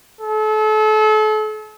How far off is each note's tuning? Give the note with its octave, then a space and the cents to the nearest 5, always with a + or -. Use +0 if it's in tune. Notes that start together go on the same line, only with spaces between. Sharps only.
A4 -35